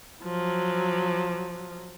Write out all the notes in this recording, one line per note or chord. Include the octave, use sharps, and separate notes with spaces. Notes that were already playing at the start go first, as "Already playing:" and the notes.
F3 F#3